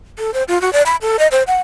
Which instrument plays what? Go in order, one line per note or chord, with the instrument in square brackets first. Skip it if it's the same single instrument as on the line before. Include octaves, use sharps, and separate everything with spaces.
[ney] A4
C5
F4
F#4
D5
B5
A4
D#5
C5
F#5